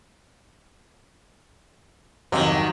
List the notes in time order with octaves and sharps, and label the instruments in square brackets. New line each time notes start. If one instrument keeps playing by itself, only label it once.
[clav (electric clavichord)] F2 G#2 C3 [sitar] D#3 F#3